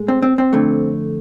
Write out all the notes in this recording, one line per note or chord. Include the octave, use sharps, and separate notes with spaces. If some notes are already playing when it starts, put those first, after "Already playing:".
Already playing: A2 G#3
C4
C4
C4
F2 D3 A3